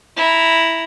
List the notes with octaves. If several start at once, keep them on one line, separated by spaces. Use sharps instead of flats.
E4 A#5